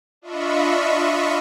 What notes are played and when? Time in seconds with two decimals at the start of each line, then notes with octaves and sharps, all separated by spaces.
0.21 D4 F4 D#5 E5 B5 C#6